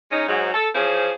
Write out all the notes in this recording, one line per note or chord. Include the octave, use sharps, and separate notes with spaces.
G#3 C#4 D#4
G#2 F#3
A4
E3 F3 C#4 G#4 C5